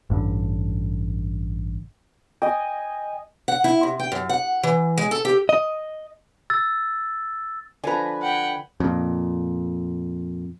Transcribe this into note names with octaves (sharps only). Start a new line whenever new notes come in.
A1 G2 B2 D3
D#5 G5 G#5
F#5
E4
C3
G5
F#2
F#5
E3
G#3
A4
G4
D#5
E6 A6
D3 F3 B4 G#5 A#5
F#5 G5
F2 A#2